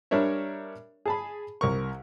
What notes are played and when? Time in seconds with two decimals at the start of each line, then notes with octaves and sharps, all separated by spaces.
0.11 G3 D4 A#4 C#5 E5
1.06 G#4 A5 B5
1.61 C2 A#4 C#6